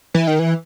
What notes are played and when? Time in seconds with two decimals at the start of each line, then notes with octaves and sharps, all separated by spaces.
0.14 E3
0.27 D#3
0.39 E3